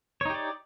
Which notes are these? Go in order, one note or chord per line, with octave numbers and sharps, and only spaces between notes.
D#4 G4 C#5 D5